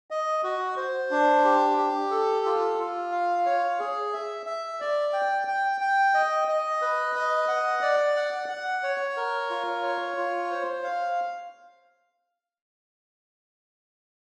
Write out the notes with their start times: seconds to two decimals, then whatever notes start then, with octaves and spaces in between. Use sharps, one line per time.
0.11 D#5
0.44 F#4
0.77 C5
1.11 D4
1.45 G4
1.77 G4
2.11 A4
2.46 F4
2.78 F4
3.12 F5
3.46 C#5
3.79 G#4
4.13 E5
4.46 E5
4.80 D5
5.13 G5
5.48 G5
5.81 G5
6.14 D#5
6.48 D#5
6.82 B4
7.16 D#5
7.48 F#5
7.82 D5
8.16 F#5
8.49 F#5
8.83 C#5
9.17 A#4
9.50 F4
9.83 C#5
10.17 F4
10.51 C5
10.84 F5